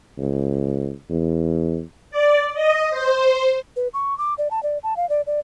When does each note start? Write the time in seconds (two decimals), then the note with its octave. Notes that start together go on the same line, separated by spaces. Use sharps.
0.17 C#2
1.10 E2
2.11 D5
2.54 D#5
2.90 C5
3.76 B4
3.94 C#6
4.18 D6
4.38 D5
4.51 A5
4.63 D5
4.83 A5
4.97 F5
5.09 D5
5.27 D5